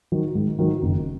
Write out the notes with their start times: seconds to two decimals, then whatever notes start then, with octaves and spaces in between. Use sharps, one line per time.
0.12 D#3 F#3
0.35 G#2
0.59 D#3 F#3
0.82 F#1